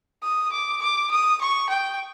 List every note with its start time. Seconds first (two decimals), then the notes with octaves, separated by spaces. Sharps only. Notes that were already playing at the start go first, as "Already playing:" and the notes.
0.23 D#6
0.52 D6
0.82 D6
1.11 D#6
1.41 C#6
1.69 G5